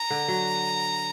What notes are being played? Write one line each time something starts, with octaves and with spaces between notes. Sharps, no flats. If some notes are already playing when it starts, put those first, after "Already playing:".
Already playing: A#5
D3
F#3